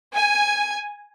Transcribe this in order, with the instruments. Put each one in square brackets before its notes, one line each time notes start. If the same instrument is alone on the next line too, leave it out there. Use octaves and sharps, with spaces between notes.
[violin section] G#5